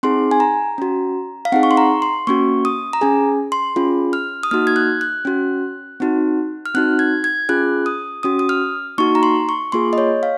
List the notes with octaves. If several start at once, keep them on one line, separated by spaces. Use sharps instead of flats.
C4 D#4 G#4 C6
G#5
A#5
C#4 F#4
F5
C4 D#4 G#4 F#5
C#6
C6
A#5
C6
A#3 C#4 F#4 C#6
D#6
A#5
C#4 G#4 G#5
C6
C#4 F4 G#4
F6
D#6
A#3 D#4 F#4 F6
G#6
F#6
F#6
C#4 F#4
C4 D#4 F#4
F6
C4 D#4 F#4 F#6
G#6
G#6
C#4 F4 G#4 F#6
D#6
C#4 F#4 D#6
D#6
F6
A#3 D#4 F#4 C#6
A#5
C6
C#6
A#3 F4 G#4 C6
D#5
C#5
F5